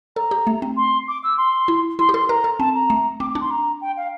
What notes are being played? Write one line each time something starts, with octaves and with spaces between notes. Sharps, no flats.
A4 A#5
G4
A3
C4
C6
D6
E6
C6
E4
E4 C6
G4
A4 C6
A#4 A#5
A4
C4 A5
A#5
A3
C4 D6
D6
D4
C6
A#5
G5
F5